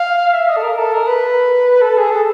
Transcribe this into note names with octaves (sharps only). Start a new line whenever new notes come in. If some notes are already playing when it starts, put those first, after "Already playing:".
Already playing: F5
E5
D#5
A4
A#4
A4
A#4
B4
A4
G#4
A4